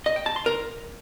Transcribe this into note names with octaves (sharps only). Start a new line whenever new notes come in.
D#5
G5
A5
C6
A#4